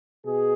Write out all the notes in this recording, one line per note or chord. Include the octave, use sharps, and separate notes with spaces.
B2 G#4